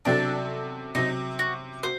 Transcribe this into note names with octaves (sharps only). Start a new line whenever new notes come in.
C3 F#3 C4 D4 F#4 A4
C3 F#3 C4 D#4
F#4
F#4 C5